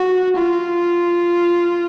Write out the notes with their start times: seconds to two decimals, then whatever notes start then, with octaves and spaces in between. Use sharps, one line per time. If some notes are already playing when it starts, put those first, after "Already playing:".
Already playing: F#4
0.35 F4